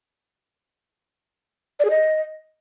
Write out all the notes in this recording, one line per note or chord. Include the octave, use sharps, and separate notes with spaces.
D5
G#4
D#5